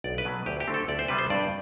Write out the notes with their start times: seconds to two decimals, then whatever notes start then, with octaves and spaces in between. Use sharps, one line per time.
0.04 B1 D5
0.18 B4
0.25 B2 F#3
0.46 D2 G4
0.60 G4
0.67 D3 A3 C4
0.74 A4
0.88 D2 D5
0.99 C5
1.08 C3 G3 B3 B4
1.19 C5
1.30 G2 D5